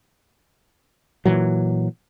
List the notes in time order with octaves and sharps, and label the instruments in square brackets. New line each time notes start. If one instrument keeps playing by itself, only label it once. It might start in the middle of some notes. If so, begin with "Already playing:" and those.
[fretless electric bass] A#2 E3 F#3